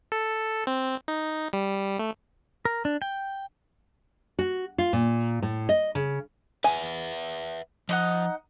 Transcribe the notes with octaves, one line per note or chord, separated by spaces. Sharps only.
A4
C4
D#4
G3
A3
A#4
D4
G5
F#4
F4
A#2
A2
D#5
C#3
B4 E5 F#5 G#5
F3 D#4 D#5 F#5